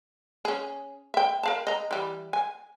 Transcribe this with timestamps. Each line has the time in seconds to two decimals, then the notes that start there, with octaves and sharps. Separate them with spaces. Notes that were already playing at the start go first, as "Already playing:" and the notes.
0.45 C#4 G#4
1.14 E5 G5
1.43 A#4 F5 A5
1.67 D#5 A#5
1.91 E3 G3
2.33 G#5